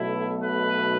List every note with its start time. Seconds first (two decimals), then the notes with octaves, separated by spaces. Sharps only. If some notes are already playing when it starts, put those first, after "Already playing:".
Already playing: B1 B2 A3 E4
0.43 B4